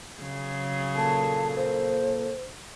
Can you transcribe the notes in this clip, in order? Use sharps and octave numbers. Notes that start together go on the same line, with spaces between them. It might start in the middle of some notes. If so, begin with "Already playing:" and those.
C#3 F#3 G#4
A#2 A#3 A4 A5
C5